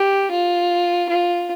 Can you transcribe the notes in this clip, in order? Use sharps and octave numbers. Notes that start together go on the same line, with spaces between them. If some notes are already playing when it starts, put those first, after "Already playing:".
Already playing: G4
F4
F4